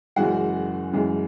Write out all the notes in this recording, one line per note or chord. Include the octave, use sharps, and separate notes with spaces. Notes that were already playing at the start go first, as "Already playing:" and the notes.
F#1 F#2 E3 G#3 F#4 F#5
F#1 F#2 E3 G#3